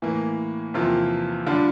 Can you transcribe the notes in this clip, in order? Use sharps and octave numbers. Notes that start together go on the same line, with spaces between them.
A2 E3 A#3
E2 C3 F3 A#3 F4
D3 G3 D4 F4